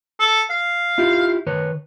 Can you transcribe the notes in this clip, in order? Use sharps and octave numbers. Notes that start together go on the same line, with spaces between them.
A4
F5
E4 F4 G4
D#3 B4 C#5